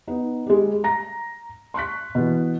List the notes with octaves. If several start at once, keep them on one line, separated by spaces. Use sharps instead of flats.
B3 D#4
G3 G#3
A#5 A#6
C6 C#6 F#6 B6
B2 E3